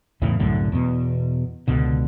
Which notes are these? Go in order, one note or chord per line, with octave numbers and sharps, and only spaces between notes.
E2 A2 C#3 E3
C2 F#2 A2 D3
E2 B2
C#2 B2 D3